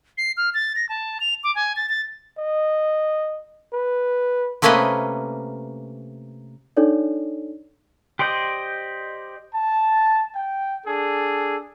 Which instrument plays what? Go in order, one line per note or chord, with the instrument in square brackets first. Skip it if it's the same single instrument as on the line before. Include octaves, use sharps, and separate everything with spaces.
[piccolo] C7
F6
A6
A#6
A5
F7
D6
G#5
A6
A6
[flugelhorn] D#5
B4
[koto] C3 A3 A#3 C#4 B4 D#5
[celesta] D4 D#4 A4 C#5 D5
[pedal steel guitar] G4 C5 D5 D#5
[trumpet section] A5
G5
D4 G#4 A4